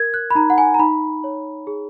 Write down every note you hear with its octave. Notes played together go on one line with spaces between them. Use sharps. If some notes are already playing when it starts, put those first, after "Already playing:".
Already playing: A#4 G#6
F#6
B5
D#4 A#5
F#5
G#5
A#5
D#4 B5
C#5
G#4